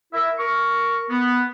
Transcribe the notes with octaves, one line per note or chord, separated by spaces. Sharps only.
E4 A#4 E5
A#4 C#6
B3